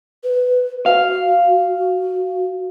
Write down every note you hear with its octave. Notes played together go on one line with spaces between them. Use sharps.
B4
F#4 F5